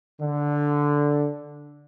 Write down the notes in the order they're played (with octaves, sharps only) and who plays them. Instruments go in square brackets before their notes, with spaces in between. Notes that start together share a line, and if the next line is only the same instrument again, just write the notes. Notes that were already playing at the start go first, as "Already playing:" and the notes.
[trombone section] D3